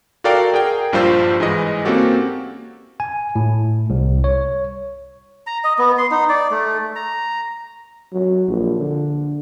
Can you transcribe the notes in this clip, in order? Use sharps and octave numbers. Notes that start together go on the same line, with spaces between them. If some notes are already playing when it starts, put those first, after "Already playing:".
F#4 A4 A#4 D5 F5 G5
G#4 A#4 G5
A#1 G2 G3 F4 C5 E6
G#2 E3 G#3 D#5
A#3 C4 C#4 F#4 G4 A4
G#5
A2
C2
C#5
A#5
D#5
B3
C6
D#4
D5
A3
A#5
F#3
A#1
D3